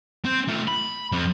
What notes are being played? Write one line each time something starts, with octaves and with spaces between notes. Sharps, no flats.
C4 C5
A3 F4
B5
F2